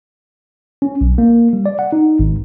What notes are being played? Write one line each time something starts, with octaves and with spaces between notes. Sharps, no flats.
C#4
B1
A#3
G3
D5
F#5
D#4
G#1